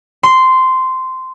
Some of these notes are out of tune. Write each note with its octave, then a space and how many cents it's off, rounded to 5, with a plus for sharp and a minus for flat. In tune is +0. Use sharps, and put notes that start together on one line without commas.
C6 -10